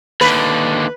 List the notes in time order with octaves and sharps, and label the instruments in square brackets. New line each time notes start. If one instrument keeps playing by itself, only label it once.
[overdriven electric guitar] D#2 D3 [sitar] B4